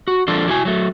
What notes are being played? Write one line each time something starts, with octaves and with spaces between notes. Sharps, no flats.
F#4
F3 D4 F4 A4 D5
E4 F#4 G#5
F#3 A3